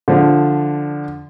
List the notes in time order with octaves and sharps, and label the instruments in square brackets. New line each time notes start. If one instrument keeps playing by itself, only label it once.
[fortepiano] D3 F3